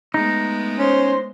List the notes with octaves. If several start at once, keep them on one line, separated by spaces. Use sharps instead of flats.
G#3 A3 B3 D#4
C#4 C5